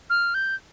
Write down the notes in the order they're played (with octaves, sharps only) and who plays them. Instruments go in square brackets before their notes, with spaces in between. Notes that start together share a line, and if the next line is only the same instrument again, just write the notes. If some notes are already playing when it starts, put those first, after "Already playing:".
[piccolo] F6
G6